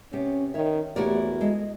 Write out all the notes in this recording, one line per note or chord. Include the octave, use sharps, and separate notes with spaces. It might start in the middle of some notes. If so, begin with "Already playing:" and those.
C3 B3 C#4 G4
D#3 C#5 E5
E2 A3 E4 F#4 G4 A#4 C#5 D5
G#3 A4 D#5